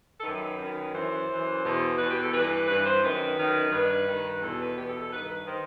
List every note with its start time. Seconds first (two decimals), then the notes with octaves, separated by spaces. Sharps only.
0.20 A4
0.23 F#2 D#3 B4
0.58 F#2 D#3
0.93 F#2 E3 C5
1.28 F#2
1.33 E3
1.64 E2 B2
1.98 E2 B2 B4
2.10 G4
2.22 A4
2.33 G2 E3 B4
2.68 G2 E3 B4
2.85 C5
3.03 F#2 D#3 B4
3.37 F#2 D#3
3.72 G2 D#3 B4
4.08 G2 D#3
4.42 E2 B2 A4
4.60 B4
4.77 E2 B2 G4
4.89 A4
5.00 A4
5.12 G2 D#3 B4
5.29 B4
5.46 D#3 C5